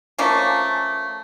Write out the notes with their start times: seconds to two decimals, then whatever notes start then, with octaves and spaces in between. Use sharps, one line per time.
0.18 F3 A3 A#3 C#4